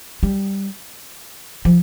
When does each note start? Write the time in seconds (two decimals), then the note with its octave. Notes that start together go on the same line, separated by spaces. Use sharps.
0.23 G3
1.65 F3